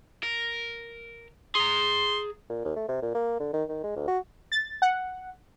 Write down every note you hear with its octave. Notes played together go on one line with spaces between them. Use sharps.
A#4
G#4 A#5 C6
A#2
D#2
A3
C3
A#2
A#3
D3
D#3
D#3
G#3
D2
F#4
A6
F#5